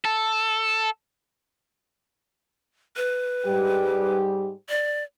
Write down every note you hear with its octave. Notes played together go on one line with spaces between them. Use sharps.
A4
B4
G#2 G3 G4
D5